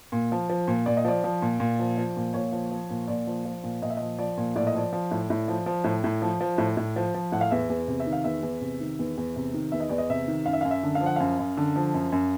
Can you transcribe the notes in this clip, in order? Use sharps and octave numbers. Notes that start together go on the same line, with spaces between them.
A#2
F3
F3
A#2
A#2 D5
D#5
F3 D5
F3
A#2
A#2
F3
F3
A#2
A#2 C#5
F3
F3
A#2
A#2 D5
F3
F3
A#2
A#2 D#5
E5
F3 D#5
F3 D5
A#2
A2 D5
D#5
F3 D5
F3
A2
A2
F3
F3
A2
A2
F3
F3
A2
A2
F3
F3
A2 F#5
F5
E2 E5
E2
C3
E5
D#3
F5
E2 E5
E2
C3
D#3
E2
E2
C3
D#3
E2 E5
D#5
E2 D5
D#5
C3 E5
D#3
F#2 F5
E5
F#2 F5
E5
D3
F5
F3
F#5
F#2 F5
F#2
D3
F3
F#2
F#2